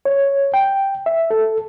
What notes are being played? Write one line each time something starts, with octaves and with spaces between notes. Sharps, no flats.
C#5
G5
E5
A4